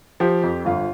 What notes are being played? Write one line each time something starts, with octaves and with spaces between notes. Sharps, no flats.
F3 G4
F2
G1 F4